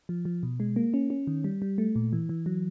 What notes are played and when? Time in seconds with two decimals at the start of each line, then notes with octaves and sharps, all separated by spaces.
0.09 F3
0.25 F3
0.43 B2
0.60 G#3
0.76 A#3
0.94 C#4
1.10 C#4
1.27 D#3
1.44 G3
1.62 G3
1.78 A3
1.96 A#2
2.13 E3
2.29 E3
2.46 F#3